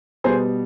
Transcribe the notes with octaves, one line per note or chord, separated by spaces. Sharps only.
B2 G3 B3 G#4 C5